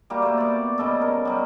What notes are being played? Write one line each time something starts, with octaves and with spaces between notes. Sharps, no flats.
G3 A#3 F#4 G4
A3 C5
B3 D5
C#3 G3 A4 D#5
A#4
B2 F#3 G3